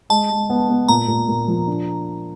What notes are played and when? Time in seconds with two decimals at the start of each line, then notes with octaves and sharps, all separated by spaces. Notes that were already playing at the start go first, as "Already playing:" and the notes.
0.10 G#3 A5
0.30 G#3
0.50 B3
0.69 B3
0.88 A#2 A#5
1.08 A#2
1.28 A#2
1.48 F3
1.67 D4